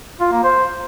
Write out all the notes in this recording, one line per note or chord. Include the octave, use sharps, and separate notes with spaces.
F4
A#3
C5